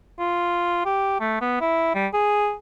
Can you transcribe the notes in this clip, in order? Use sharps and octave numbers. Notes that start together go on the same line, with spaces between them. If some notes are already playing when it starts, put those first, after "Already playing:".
F4
G4
A3
B3
E4
G3
G#4